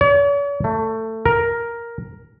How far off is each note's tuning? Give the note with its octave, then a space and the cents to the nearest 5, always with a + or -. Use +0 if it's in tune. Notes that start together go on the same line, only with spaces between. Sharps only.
C#5 +45
A3 +20
A#4 +5